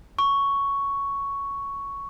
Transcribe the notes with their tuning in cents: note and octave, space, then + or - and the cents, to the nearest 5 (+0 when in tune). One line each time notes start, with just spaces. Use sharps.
C#6 +5